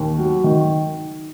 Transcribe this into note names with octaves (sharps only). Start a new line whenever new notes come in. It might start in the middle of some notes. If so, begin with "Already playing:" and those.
Already playing: D#2
F#3
D#3